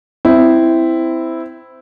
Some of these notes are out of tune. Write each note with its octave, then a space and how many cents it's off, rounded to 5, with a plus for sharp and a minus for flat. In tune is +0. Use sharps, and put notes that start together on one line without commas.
C4 -15 E4 +0